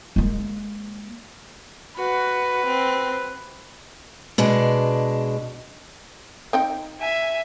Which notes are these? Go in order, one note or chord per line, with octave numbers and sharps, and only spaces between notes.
G#3 A#3
F#4 B4
C4
B2 G#3 D4
C4 D#4 G5
E5 G#5